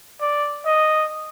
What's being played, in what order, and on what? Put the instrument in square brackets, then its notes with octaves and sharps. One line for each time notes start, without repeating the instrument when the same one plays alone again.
[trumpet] D5
D#5